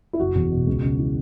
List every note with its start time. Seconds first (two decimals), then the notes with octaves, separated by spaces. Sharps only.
0.13 E4
0.19 F#1 F#4
0.35 E2
0.51 B2
0.67 C#2
0.83 C#3
0.99 E3